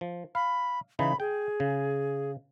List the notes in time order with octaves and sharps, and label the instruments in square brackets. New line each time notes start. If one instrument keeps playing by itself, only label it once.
[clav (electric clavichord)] F3
[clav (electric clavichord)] F5 [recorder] B5
[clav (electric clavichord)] C#3 E3 D#4 [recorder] B5
[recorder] G#4 [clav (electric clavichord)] G5
[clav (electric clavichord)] C#3